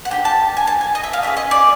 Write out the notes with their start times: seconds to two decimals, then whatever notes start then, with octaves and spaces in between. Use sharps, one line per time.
0.05 F#5
0.10 D4 G4 G5
0.25 A5
0.57 G#5
0.67 A5
0.81 G#5
0.95 D#5
1.04 E5
1.13 F5
1.22 C#4 F4 E5
1.27 G#4
1.37 D#5
1.51 D5